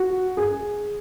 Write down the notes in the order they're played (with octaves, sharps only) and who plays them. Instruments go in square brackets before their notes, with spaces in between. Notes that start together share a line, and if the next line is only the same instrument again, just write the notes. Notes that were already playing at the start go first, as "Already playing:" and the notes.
Already playing: [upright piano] F#4
G#4